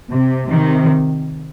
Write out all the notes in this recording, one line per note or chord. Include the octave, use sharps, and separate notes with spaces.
C3
C3 D#3